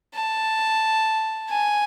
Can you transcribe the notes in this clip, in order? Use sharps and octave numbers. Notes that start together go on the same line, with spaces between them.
A5
G#5